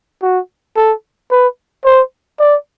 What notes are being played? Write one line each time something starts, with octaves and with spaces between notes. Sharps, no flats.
F#4
A4
B4
C5
D5